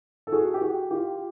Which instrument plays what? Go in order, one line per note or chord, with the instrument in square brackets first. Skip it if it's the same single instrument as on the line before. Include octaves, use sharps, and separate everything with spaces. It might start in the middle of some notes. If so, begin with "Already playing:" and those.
[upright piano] A4
F#4 G#4
G4
F#4 G#4
F4 G4